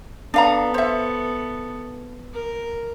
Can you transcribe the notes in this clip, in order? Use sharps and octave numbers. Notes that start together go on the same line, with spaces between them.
B3 D4 A4 F5 A#5
C5 E5
A#4